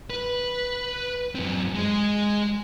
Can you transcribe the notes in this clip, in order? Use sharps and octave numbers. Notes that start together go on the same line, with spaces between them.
B4
F#2 C4
G#3